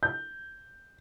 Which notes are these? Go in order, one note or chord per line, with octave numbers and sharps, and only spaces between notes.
G6